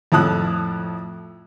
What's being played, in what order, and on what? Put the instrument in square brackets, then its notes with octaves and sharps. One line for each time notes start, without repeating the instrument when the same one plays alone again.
[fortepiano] F2 A2 F3 A5 D#6 F#6